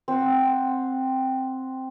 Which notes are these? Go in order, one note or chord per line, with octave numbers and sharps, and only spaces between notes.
C4 F#5